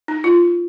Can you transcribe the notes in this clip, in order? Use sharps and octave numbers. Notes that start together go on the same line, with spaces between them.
D#4
F4